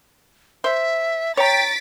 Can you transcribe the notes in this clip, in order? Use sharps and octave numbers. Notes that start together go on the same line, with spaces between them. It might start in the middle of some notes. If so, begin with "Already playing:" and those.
C5 E5
C#5 G5 A#5 A6 B6 D7